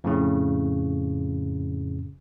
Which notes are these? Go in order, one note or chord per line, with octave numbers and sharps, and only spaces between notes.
F2 A2 C#3